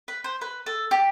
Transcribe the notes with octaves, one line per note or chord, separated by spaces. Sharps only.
B4
C5
B4
A4
G4